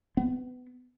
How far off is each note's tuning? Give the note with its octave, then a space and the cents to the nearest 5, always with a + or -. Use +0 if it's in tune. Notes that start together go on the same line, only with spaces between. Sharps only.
B3 +20